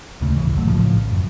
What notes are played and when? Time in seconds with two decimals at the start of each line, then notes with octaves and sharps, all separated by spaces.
0.21 D2 C#3 A3
0.35 A1 C#3 E3
0.53 F#1 C2 F#3 A3
0.65 A#1 A2 C#3 F3
1.12 F#2